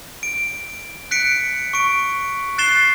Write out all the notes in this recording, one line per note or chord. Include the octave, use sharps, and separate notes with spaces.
D7
F#6 B6 C#7 D7
C#6 D7
F#6 A6 C7 E7 G7